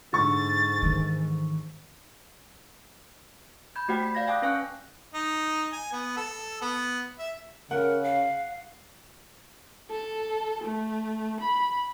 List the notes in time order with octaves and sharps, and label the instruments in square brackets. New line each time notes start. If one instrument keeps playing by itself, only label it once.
[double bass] G#2 [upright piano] D3 C#6 [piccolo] A6
[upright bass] D#3 E3
[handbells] B5 G6 G#6
A3 F#4 G4 C5 F#5 G5
B5 B6
D5 F5 G6 G#6 A#6
F5 G5 A5 D6 D#6 F#6
C#4 B4 F5 G#5 C#6 F#6
[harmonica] D#4
G#5
B3
A4
B3
E5
[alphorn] C#3 [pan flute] A#4 [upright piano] F#5
[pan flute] F5
[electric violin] A4
A3
B5